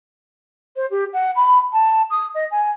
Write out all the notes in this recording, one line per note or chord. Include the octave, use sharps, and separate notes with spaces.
C5
G4
F#5
B5
A5
D#6
D#5
G#5